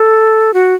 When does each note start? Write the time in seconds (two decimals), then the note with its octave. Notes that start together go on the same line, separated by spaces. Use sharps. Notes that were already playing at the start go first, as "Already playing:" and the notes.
Already playing: A4
0.54 F#4